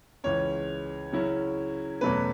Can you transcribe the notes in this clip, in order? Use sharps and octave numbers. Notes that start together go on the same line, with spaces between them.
C#2 C#3 E3 C#4 C#5
C#3 F#3 C#4 E4
E2 B2 F#3 A3 C#4 B4